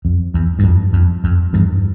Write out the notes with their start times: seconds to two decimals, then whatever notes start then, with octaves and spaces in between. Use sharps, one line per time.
0.05 F2
0.34 E2
0.59 G2
0.64 F2
0.93 F2
1.24 F2
1.53 E2 G2